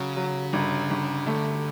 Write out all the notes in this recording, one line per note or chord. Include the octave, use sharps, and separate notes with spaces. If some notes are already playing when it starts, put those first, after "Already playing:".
Already playing: C#3 F#3
F#3
G1
G1
D3 A3